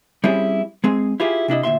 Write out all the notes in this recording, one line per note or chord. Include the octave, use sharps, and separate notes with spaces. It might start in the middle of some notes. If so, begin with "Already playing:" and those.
G3 C4 C#4 E4 G#4
G#3 C4 G#4
E4 F4 G4 G#4
C3 D4 E4 D#5
D2 A#2 E5 C6